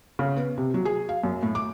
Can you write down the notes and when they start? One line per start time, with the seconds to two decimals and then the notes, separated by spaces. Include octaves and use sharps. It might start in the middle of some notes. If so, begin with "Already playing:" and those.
0.19 C#3
0.36 B3
0.58 C3
0.74 F#3
0.85 G#4
1.09 F5
1.24 F#2
1.43 A2
1.55 D6